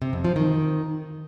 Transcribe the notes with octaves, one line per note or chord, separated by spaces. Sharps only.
C3
F2
F3
D#3